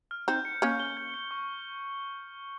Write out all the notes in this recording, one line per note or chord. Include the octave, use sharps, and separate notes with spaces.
F6
C4 D#4 G6
C#7
A#3 C#4 C#6
G7
G6
C#7
C#6